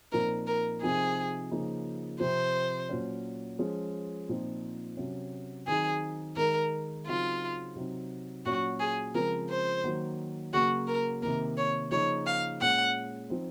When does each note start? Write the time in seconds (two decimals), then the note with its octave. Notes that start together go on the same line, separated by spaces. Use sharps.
0.12 A#2 F3 C4 D#4 A#4
0.47 A#4
0.82 C3 F3 C4 D#4 G#4
1.51 C#3 F3 A#3 D#4
2.20 C3 F3 C4 C5
2.89 A#2 F#3 C#4
3.59 F3 G#3 C#4
4.29 A#2 F3 C4 D#4
4.97 C3 F#3 C#4
5.67 D#3 F#3 C4 D#4 G#4
6.36 D#3 G#3 D#4 A#4
7.06 C#3 F#3 C4 D#4 F4
7.76 C3 F#3 C4 D#4
8.45 A#2 F#3 C#4 F#4
8.80 G#4
9.14 C#3 F3 G#3 C4 A#4
9.49 C5
9.84 D#3 F#3 A#3
10.53 C#3 F#3 A#3 F#4
10.88 A#4
11.22 C3 D#3 A#3 A#4
11.57 C#5
11.92 C#3 F3 A#3 D#4 C#5
12.26 F5
12.61 A#2 G#3 C#4 F#5
13.30 F3 C4 D#4